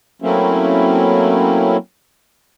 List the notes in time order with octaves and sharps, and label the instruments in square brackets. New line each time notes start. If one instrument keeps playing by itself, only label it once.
[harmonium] F#3 A3 A#3 C4 C#4 E4